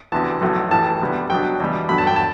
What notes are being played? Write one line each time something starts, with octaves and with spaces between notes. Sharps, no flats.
D2 C3 E3 B3 A5
B1 A2 F#3
A1 A2 E3 A5
D2 C3 G3 B3
B2 F#3 B3 D4 G5
E2 B2 G3
G2 D3 F#3 B5
A5
G5
A5